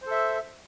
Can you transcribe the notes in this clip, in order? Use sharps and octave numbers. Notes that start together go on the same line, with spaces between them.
A4 C5 E5